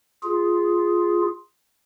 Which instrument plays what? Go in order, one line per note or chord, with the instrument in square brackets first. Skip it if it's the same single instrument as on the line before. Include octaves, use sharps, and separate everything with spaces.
[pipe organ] F4 G#4